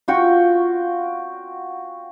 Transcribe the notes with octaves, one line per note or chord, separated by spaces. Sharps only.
F4 F#4 G5 C#6